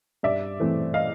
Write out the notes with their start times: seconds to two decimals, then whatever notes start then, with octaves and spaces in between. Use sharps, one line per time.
0.23 G2 D5 E5
0.60 E3 A3 C4
0.94 D#5 F5